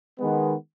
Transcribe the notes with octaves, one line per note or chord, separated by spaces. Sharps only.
D#3 G#3 B3